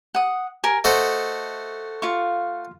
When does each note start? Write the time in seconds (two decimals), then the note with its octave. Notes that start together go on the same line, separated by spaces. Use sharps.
0.15 F#5 D#6
0.64 A#4 G#5
0.84 A3 F#4 C5 D#5
2.02 F4 F5 C#6